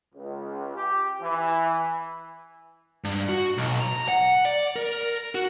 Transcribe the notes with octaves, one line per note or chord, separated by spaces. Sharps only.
C#2
G4
E3
G2
F#4
B1
A#5
F#5
D5
A#4
F#4